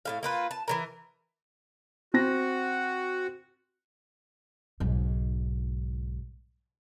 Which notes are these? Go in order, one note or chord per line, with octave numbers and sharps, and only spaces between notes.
A2 G#3 F5
A#3 F4 B4
A5
E3 F#3 A#4
C4 F#4 A#6
B1 G#2